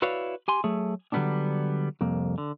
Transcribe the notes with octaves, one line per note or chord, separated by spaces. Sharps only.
E4 F#4 B4 C#5 D5 F5
G4 G#5 C6
F#3 A3 G#4
D3 F#3 G3 B3 C4 D4
C2 F2 A#3
D3